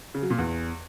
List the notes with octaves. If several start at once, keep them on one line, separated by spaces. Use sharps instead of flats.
C#3
F#3
A#2
E2